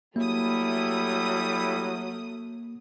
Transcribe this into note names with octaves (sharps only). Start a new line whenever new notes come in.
F#3 G3 A3 A#3 E4 D#6